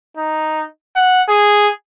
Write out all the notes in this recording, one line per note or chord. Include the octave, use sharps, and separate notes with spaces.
D#4
F#5
G#4